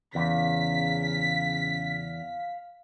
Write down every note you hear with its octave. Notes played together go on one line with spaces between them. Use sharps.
E2 C#3 F5 B6